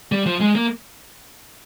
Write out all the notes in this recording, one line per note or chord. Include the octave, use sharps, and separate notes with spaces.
G3
F3
G#3
A#3